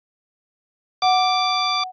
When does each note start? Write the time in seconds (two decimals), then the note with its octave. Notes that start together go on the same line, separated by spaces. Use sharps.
1.02 F#5 D6